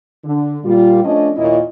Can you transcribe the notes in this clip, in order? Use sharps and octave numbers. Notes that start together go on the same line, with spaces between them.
D3
A#2 G3 F4
F3 A3 C#4 D4 D#5
D#2 A#2 E4 C#5 D#5